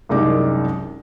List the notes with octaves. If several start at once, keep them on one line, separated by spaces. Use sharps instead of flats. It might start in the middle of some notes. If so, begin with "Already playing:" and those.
C2 F#2 G#3 D#4 D5 D6